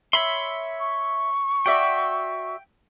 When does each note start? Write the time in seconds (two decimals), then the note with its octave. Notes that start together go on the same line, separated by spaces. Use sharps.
0.13 C#5 E5 B5 C6
0.80 C#6
1.66 F#4 D5 E5 G5